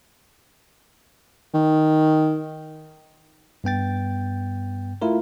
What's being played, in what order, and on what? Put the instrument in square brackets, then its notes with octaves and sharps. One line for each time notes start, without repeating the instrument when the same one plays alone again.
[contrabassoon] D#3
[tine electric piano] G2 B3 G5 A6
A3 E4 F4 A#4